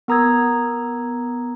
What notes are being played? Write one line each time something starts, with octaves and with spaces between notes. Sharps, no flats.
B3 A#4 A#5 D#6 E6 G#6